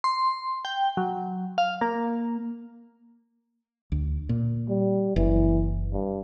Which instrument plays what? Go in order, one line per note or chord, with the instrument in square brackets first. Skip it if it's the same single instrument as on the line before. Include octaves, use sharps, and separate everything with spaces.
[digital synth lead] C6
G5
F#3
F5
A#3
[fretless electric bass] D2
A#2
[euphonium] G3
[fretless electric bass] F#1 [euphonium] E3
[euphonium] G2